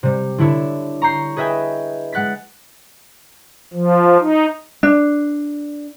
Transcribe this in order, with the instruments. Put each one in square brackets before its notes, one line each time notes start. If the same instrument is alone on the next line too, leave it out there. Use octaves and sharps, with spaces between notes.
[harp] C3 G3
D3 D4 E4 C#5 E6
A#5 C#6 G6 C7
G#4 B4 D#5 E5 G5 G#5
G#3 F#5 F#6 A6 B6
[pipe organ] F3
D#4
[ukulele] D4